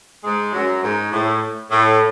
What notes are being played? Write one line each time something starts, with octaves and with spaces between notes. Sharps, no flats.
G#2 G#3
F#2 F#3
G#2
A2
A2